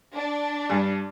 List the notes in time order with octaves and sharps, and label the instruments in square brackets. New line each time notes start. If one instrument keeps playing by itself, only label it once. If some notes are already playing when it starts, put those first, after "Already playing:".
[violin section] D4
[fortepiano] G2